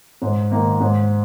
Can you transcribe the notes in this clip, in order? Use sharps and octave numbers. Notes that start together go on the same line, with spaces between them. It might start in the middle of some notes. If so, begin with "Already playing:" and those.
G#2
D#3 A#3
G#2